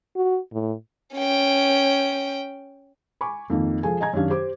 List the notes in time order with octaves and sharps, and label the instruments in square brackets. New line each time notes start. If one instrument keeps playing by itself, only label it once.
[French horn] F#4
A2
[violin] C#4 G5
[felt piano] G#5 B5 C#6 D6
F2 D#3 A#3 D#4
F3 G#4 A4 G#5
D#5 G#5 A#5 G#6
F#2 D#3 D4 G4 F5
G4 C5 D6